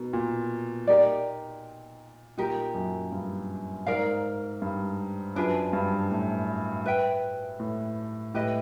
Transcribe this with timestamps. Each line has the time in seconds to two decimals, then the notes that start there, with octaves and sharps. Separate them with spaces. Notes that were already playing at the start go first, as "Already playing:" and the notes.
Already playing: B2 D#4 A#4
0.13 A#2
0.87 D#4 G4 A#4 D5
2.38 A#2 D#4 G4 A#4
2.74 F#2
3.12 G2
3.86 G#2 A#4 D5 F5
4.62 G2
5.36 F#2 D4 F4 G#4 B4
5.73 G2
6.11 A2
6.86 B4 E5 G5
7.60 A2
8.34 A2 G4 B4 D#5